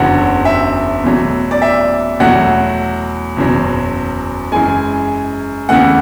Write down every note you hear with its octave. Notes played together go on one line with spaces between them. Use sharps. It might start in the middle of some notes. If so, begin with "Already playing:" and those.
Already playing: F#1 E2 D3 F#3 F#5
E5
E2 B2 F#3 A3
D5
E5
E2 B2 F#3 A3 F#5
F#1 E2 B2 F#3
F#2 E3 G#3 G#5
E2 C#3 E3 A3 F#5